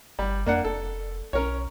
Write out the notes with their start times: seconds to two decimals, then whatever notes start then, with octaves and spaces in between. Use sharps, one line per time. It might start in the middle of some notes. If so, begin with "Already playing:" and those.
0.19 G1 G3
0.46 F2 A#3 D4 F#5
0.64 F1 A4
1.33 B1 C#4 A#4 C#5